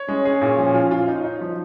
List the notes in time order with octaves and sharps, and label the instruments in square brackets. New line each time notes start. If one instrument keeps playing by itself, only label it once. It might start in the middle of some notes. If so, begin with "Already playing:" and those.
Already playing: [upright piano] C#5
[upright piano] G#3 [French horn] C#4
[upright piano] G#4
A#2
F3
F4
F4
D#4
D#4
F3